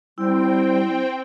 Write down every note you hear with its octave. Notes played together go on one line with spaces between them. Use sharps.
G3 C4 E4 G5